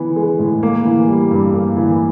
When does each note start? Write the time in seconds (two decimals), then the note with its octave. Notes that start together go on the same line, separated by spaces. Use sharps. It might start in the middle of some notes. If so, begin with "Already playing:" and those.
Already playing: E3 B3
0.16 G#3
0.39 A2
0.63 A#3
0.85 E3
1.08 G3
1.31 G2
1.54 A#3
1.77 E3